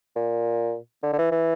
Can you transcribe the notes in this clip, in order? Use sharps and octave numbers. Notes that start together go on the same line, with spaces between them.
A#2
D3
D3
E3
E3